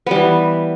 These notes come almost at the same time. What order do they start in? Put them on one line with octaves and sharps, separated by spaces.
B3 G3 E3